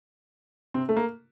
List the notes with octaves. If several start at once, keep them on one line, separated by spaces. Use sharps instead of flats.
C3 C4
A3
A#3